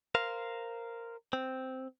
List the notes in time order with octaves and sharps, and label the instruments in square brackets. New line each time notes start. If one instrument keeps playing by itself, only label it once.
[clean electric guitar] A#4 C5 F5
C4